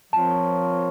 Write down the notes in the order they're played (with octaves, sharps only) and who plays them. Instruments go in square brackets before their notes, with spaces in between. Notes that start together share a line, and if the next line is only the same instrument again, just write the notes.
[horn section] F3 C4 F4 A#4 C#5 [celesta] A5